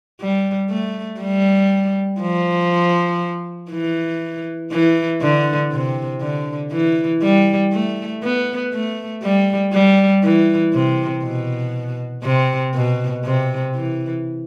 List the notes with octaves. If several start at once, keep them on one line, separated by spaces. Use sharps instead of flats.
G3
A3
G3
F3
E3
E3
D3
C3
D3
E3
G3
A3
B3
A3
G3
G3
E3
C3
B2
C3
B2
C3
E3